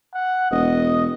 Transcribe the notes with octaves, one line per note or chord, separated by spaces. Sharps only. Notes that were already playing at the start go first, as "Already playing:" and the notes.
F#5
E1 D#5